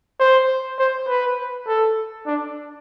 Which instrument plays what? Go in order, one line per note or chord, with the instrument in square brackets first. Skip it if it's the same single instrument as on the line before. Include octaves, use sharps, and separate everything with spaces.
[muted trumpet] C5
C5
B4
A4
D4